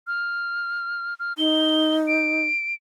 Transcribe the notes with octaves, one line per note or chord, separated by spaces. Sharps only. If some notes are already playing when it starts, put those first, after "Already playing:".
F6
F6
D#4 G7
D7